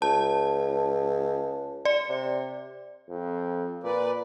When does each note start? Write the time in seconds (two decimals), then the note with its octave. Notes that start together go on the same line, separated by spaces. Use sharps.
0.02 C#2 A5
1.85 D5
2.09 C3
3.09 F2
3.84 A#2 B4 D5